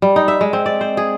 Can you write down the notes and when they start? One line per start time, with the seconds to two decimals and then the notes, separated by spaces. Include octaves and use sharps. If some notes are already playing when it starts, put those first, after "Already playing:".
0.02 G3
0.16 D#4
0.28 E5
0.41 G#3
0.53 C4
0.66 D5
0.81 C5
0.97 G#4